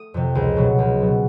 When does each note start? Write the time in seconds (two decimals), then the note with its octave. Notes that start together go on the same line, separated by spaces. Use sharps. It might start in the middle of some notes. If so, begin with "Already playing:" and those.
Already playing: A3 D#6
0.14 F2 C3
0.35 C#2
0.57 B2 F#3 B3
0.79 C#2
1.00 B2 F#3 B3